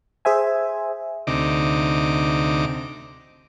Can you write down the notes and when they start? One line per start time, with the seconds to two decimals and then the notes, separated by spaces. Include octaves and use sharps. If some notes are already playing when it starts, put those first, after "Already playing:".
0.25 G#4 C5 E5 G#5
1.27 D2 C3 D#4 D6